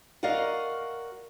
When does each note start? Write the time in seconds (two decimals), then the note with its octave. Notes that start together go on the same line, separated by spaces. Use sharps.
0.23 F#4 A#4 D5 D#5 F5